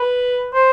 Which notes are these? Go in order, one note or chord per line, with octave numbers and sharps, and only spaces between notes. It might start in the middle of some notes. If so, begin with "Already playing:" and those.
Already playing: B4
C5